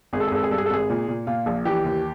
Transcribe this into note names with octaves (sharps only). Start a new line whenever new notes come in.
G#1 G#4
A4
G#4
G#1 A4
G#4
G2 A4
G#4
A4
G#1 G#4
A#2
A#2
A#2 F4
A#1
E3 G4
D#2